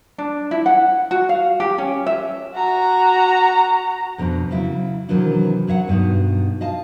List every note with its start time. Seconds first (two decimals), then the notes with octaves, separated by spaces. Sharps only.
0.18 D4
0.51 E4
0.66 F#5
1.11 F#4
1.29 F5
1.60 G4
1.78 C#4
2.06 E5
2.53 F#4 A#5
4.18 F2 B2 D4 C5
4.51 C#3 F#3 E4
5.08 C3 D#3 E3 F#3 D4
5.67 F#3 C#5 E5 F#5
5.88 G2 B2 D4 D#4
6.61 D#5 F5 A5